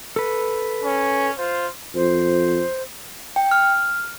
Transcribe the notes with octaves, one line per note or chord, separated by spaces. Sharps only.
A4 B4
C#4
F4 C5
F2 C5
G5
F6